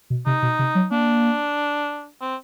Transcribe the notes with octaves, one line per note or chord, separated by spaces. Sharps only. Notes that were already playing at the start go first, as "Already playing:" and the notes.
B2
C3 D#4
B2
C3
F#3
A#3 D4
C4